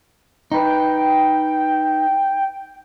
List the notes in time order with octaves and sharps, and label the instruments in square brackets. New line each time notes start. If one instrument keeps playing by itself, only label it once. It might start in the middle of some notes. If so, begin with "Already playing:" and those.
[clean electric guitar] D#4 B4 [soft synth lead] G5